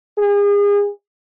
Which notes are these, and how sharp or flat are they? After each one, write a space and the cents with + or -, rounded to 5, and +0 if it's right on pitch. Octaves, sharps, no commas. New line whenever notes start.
G#4 -35